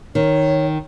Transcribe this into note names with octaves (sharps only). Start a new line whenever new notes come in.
D#3 C#5